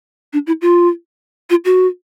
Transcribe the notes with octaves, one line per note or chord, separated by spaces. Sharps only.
D4
E4
F4
F4
F#4